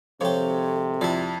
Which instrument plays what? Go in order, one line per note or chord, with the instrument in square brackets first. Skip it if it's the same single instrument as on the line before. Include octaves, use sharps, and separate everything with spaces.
[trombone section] G#1 C3 C4 [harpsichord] F3 G4 [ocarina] A4 [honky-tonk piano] C#5
[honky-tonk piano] F2 [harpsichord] E4 D5